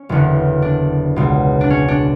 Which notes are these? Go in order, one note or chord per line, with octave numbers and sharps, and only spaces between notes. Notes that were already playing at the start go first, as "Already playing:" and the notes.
Already playing: C#4
F#1 E2 D3
D4
C#2 B2
D4
C#4
D4